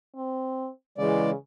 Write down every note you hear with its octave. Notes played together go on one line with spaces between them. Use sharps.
C4
C#3 E3 G#3 D5